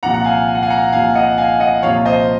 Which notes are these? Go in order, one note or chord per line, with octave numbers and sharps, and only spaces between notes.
C2 A#2 F3 F#5 A#5
F#5
F5 G#5
G#5
F#5
F5 G#5
F#5 A#5
C2 A#2 F3 F5 G#5
D#5 F#5
F5 G#5
D#5 F#5
C2 A#2 F3 C#5 F5
C5 D#5